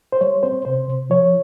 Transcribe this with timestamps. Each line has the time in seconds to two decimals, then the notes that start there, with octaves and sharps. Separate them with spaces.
0.12 C5
0.21 G3 C#5
0.43 C4 C5
0.65 C3 C5
0.88 C3
1.10 F3 C#5